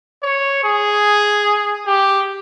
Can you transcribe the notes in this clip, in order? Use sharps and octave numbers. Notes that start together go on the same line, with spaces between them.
C#5
G#4
G4